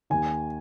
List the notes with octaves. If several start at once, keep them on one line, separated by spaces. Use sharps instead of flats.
D#2 D#3 G#5